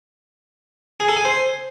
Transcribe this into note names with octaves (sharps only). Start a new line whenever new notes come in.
G#4
A4
G#5
C5